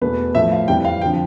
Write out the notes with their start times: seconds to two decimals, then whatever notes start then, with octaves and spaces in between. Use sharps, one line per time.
0.01 E2 B2 A3 B4
0.35 A2 F3 A3 E5
0.52 F5
0.68 F2 E3 G3 G5
0.85 F5
1.01 D3 F3 G5